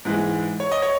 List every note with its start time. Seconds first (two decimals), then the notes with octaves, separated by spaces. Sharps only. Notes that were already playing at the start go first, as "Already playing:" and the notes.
0.05 G#2 E3 G#3
0.60 C#5
0.71 D#5
0.82 C#5